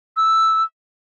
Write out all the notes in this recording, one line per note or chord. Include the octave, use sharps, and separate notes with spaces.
E6